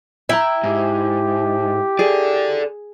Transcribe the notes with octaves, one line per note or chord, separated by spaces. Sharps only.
E4 E5 G5 A#5
G#2 G4
G#4 A4 D5